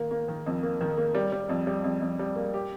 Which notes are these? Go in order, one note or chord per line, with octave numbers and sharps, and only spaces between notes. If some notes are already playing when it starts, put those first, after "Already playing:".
Already playing: D#3 A#3
A#3
D#3
F2
A#3
D#3
A#3
G3
G3
F2
G3
F2
F2
G3
A#3
G4